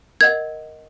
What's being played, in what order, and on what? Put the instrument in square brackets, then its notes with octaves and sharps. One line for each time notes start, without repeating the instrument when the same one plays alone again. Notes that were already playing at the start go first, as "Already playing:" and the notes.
[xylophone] A#4 D#5 F#5 G#6